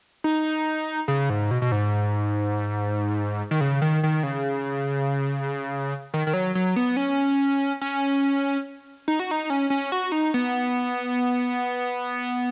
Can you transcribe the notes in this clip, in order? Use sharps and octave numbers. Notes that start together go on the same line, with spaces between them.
D#4
C#3
G#2
B2
B2
G#2
D#3
C#3
D#3
D#3
C#3
D#3
D#3
F#3
F#3
B3
C#4
C#4
D#4
F#4
D#4
C#4
C#4
F#4
D#4
B3